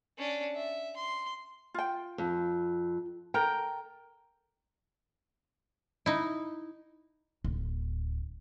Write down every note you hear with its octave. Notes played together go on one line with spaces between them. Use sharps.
C#4 D4
E5
C6
F4 G5
F2
A4 A#4 G5 A#5
D#4 E4
D1